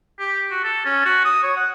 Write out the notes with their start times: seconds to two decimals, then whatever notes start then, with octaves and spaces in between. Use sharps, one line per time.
0.20 G4
0.51 F#4
0.64 A4
0.85 C#4
1.05 F#4
1.25 D#6
1.43 C#5
1.57 F#5